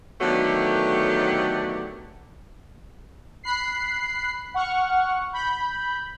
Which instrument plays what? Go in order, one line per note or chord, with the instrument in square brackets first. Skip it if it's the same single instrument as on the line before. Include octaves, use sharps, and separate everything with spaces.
[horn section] D3 D#3 F#3 A3 B3 G4
[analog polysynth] B5 F#6 C7
F#5 C#6 F6
B5 G6